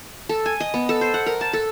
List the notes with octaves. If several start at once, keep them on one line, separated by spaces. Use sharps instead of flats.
A4
G#5
D#5
B3
A4
C5
F#5
A#4
A5
A4